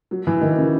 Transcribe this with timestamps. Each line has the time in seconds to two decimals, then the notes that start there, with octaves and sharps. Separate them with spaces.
0.11 F#3
0.27 E3
0.41 D#3
0.58 C#3